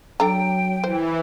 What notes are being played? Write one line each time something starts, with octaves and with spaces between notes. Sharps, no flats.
F#3 D4 A4 G5 A#5
E3 C5